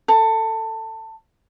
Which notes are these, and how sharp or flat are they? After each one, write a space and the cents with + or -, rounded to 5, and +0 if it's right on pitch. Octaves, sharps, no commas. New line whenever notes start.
A4 +20